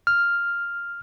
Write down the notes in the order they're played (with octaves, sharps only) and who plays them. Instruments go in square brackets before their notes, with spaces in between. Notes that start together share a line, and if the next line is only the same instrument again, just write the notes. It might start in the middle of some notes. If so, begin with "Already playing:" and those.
[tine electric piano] F6